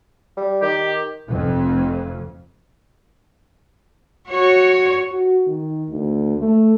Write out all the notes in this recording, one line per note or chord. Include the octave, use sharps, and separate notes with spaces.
G3
D#3 G4
F1 F2
F#4 C#5
F#4
D#3
D2
A3